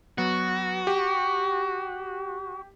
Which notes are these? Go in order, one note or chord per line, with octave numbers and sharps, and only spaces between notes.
F#3 B3 F#4
G4